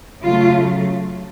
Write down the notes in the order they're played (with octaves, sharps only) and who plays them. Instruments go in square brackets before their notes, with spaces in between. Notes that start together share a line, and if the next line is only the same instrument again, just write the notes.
[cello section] C#3 F#3 A3 F4